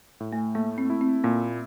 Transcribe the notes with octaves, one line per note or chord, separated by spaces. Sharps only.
A2
A3
A3 A#3
C4
E4
C4
A#2 A#3